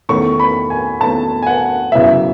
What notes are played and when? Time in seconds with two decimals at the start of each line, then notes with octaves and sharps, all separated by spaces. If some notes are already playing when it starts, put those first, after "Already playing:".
0.09 E2 D#3 A3 C#4 C#6
0.40 B5
0.70 G#5
1.01 E2 D#3 A3 C#4 A5
1.43 G#5
1.47 F#5
1.92 F#2 C#3 E3 B3 E5